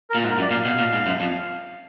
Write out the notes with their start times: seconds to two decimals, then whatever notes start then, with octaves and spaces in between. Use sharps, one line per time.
0.10 A#4
0.15 A#2
0.24 G#2
0.31 A#4
0.38 F#2
0.41 D5
0.51 A#2 F5
0.65 B2
0.78 A#2
0.93 G#2
1.06 F#2
1.20 F2